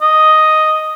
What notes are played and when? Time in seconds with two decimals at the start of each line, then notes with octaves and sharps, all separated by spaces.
0.02 D#5